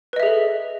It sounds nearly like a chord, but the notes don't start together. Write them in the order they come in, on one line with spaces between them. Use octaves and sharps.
B4 D#5 E5 G#4 A4